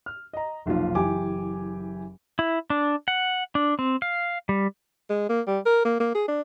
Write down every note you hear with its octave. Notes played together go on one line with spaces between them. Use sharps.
F6
D#5 A#5
F1 B1 A#3 F4
F#1 E3 G4 G#5 D6
E4
D4
F#5
D4
C4
F5
G3
G#3
A#3
G3
A#4
A#3
A#3
G#4
D4